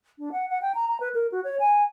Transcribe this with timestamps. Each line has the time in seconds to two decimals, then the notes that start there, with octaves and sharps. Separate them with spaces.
0.19 D4
0.32 F#5
0.49 F#5
0.62 G5
0.75 A#5
0.88 A#5
1.00 B4
1.14 A#4
1.32 F#4
1.44 C#5
1.60 G#5